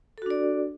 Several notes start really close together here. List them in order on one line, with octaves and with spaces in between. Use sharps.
A4 F#4 D4 D5